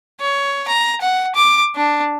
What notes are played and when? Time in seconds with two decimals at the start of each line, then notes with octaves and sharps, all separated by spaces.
0.20 C#5
0.68 A#5
1.01 F#5
1.35 D6
1.76 D4